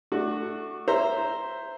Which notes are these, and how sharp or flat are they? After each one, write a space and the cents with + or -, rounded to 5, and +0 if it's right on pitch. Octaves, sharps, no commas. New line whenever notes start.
A3 +0 D4 +25 F#4 +0
C5 +0 E5 +10 A#5 +0